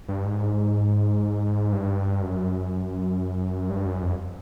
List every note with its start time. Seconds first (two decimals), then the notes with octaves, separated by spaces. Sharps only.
0.08 G2
0.25 G#2
1.72 G2
2.22 F#2
3.70 G2
3.86 F#2
4.02 F2